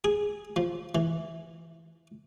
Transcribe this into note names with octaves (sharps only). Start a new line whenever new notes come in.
G#4
F3
E3